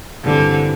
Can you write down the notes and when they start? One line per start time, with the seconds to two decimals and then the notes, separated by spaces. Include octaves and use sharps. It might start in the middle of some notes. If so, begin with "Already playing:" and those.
0.24 G2 D3 E3 C4